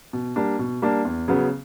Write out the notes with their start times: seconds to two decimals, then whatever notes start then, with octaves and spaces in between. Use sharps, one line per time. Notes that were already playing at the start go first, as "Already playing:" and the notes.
0.13 B2
0.36 G3 A#3 D4
0.59 B2
0.82 G3 A#3 D4
1.05 E2
1.28 C#3 F#3 B3